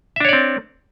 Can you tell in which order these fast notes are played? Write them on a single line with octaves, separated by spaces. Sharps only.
E5 D4 C#5 D5 C4